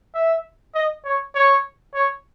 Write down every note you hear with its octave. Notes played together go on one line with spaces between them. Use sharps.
E5
D#5
C#5
C#5
C#5